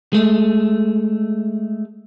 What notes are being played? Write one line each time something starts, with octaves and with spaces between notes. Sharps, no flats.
G#3 A3